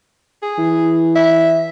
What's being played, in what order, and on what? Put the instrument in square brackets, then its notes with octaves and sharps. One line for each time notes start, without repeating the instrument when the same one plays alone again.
[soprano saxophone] G#4
[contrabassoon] E3
[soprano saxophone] E5